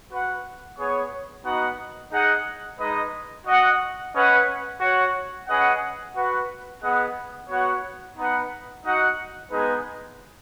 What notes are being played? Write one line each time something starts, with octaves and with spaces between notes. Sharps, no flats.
F#4 B4 F#5
B3 G#4 C#5
B3 D#4 F#4 D#5 F#5
D#4 G#4 D#5 F#5
G#3 D#4 B4 D#5
F#4 D#5 F#5
C#4 B4 D#5 F#5
F#4 C#5 F#5
C#4 G#4 B4 D#5 F#5
F#4 B4 F#5
B3 G#4 D#5 F#5
B3 F#4 C#5 F#5
B3 D#4 B4 F#5
D#4 F#4 D#5 F#5
G#3 B3 D#4 G#4 B4